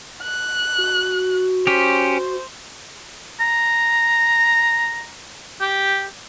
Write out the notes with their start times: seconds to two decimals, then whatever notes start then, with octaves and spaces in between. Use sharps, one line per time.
0.23 F#6
0.78 F#4
1.67 C#4 G4 C5
3.40 A#5
5.61 G4